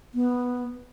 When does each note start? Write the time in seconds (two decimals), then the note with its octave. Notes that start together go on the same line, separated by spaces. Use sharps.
0.14 B3